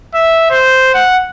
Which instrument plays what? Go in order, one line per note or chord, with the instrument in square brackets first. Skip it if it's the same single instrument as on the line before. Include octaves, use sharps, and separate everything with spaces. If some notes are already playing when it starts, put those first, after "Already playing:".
[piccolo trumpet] E5
C5
F#5